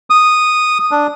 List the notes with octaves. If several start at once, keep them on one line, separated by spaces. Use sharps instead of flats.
D#6
D4